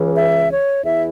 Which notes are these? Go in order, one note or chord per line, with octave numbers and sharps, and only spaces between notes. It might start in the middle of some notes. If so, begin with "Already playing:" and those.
Already playing: C#2 C#3 E3
E5
C#5
E2 E3 E5